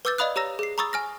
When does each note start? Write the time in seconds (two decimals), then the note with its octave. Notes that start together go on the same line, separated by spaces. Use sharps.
0.05 B4 D6 E6 G6 A6
0.18 D5 D#5 F5 B5 D#6 F#6
0.36 G4 C#5 A#5 E6 A#6
0.59 G#4 C7
0.78 A#5 B5 C#6 D#6 E6 A6
0.93 G#5 F6 A#6